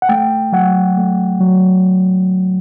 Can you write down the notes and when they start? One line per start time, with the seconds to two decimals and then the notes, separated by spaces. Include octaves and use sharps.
0.02 F#5
0.09 A3 G5
0.52 F#3 F#5
0.97 A3
1.41 F#3